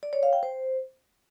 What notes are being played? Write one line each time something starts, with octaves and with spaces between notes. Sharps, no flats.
D5
C#5
F5
G5
C5